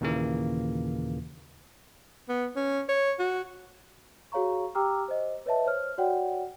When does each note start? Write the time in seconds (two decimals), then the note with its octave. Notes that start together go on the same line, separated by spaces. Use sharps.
0.01 D#2 A#2 C#3 E3 A#3
2.29 B3
2.56 C#4
2.89 C#5
3.19 F#4
4.32 F#4 G#4 C#5 F5 A#5 C#6
4.75 G4 G5 A#5 D6 E6 F6
5.08 C5 D#5
5.46 B4 C#5 D#5 E5 A5
5.65 C5 C#5 F6
5.98 F#4 C#5 D5 F#5 G5